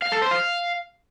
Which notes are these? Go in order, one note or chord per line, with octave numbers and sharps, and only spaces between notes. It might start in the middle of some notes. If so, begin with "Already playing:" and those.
F5
A4
C5
F5